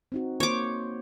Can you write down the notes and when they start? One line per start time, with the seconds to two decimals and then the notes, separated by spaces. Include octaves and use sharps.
0.12 C4 D#4 F#4
0.40 A#3 C5 C#5 D6